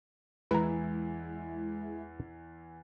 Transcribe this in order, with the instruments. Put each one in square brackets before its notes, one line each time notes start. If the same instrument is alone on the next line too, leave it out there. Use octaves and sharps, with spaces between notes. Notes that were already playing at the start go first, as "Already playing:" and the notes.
[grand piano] E2 E3 [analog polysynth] G#3 E4 [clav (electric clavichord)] B4 A#5